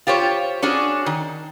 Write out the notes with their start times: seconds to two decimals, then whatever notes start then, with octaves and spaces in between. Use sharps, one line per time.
0.07 F4 G4 C5 C#5
0.62 C#4 D4 F#4 G#4
1.06 D#3